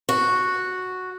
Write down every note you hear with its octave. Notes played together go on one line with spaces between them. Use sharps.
F#4